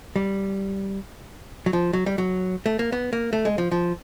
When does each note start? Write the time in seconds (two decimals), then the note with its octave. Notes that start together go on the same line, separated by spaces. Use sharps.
0.16 G3
1.66 F#3
1.73 F3
1.93 F#3
2.06 G3
2.18 F#3
2.66 A3
2.79 A#3
2.92 B3
3.13 A#3
3.33 A3
3.45 G#3
3.58 F3
3.72 F3